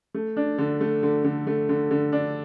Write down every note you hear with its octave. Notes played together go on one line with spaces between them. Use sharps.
A3
D4
D3
A3
D3
D3
A3
D3
D3
D4